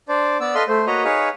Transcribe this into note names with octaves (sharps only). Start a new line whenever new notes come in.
D4 C5 D5
B3 D5 E6
A4 B4 D#5 F5 C6
A3 C5
A#3 F#4 B4 C#5 D#5 A#5
D#4 G#4 B4 C#5 F5